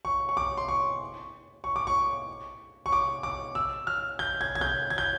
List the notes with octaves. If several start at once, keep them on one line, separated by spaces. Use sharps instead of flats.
C#6
C#6
D6
C6
C#6
C#6
D6
C#6
C#6
D6
D6
E6
F6
G6
G#6
G#6
G6
G#6
G6